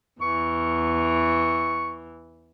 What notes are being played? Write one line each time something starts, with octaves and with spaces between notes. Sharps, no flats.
E2 E3 C#6